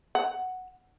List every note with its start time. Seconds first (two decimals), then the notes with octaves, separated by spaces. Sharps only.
0.15 F#5